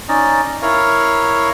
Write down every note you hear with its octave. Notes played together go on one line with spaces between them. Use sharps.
C#4 D#4 D5 D#5
E4 A#4 C#5 F5